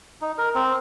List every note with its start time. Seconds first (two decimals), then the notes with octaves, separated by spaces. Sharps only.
0.21 D#4
0.38 A#4
0.55 C4